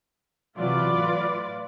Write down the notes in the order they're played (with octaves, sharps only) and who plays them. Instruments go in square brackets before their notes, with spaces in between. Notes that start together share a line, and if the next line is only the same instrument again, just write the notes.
[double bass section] C3 E3 F#3 [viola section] F4 B4 D5
[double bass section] A2